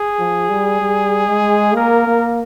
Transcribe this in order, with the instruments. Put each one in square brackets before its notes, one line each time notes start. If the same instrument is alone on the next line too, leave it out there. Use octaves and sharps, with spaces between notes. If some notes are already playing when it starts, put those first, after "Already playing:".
Already playing: [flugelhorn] G#4
[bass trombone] F3
G3
G3
G#3
[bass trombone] A#3 [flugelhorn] A#4
[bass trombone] A#3